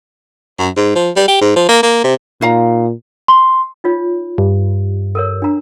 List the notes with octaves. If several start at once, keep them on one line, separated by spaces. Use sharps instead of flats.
F#2
G#2
F3
G3
G4
G#2
F3
A#3
A#3
C3
A#2 D#4 F5 A#5
C6
D#4 F4 C#5
G2
A4 A#4 C#5
D4 A#5